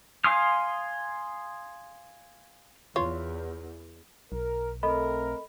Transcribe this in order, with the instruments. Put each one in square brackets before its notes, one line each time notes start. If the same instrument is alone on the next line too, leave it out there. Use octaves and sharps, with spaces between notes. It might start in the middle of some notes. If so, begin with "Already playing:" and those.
[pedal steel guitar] F5 G#5 C6 D#6 F6
[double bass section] E2 [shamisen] F4 C#5
[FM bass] B1 [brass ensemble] A#4
[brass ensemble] A3 C4 A#4 [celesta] A4 D#5 B5